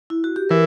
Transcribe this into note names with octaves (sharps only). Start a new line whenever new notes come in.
E4
F#4
G4
E3 A#4